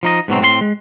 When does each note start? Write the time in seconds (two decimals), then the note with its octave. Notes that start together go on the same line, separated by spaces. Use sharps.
0.03 F3 D#4 D#5
0.28 G#2 B2 F#3 C4
0.41 A2 C4 G#4 C6
0.61 G#3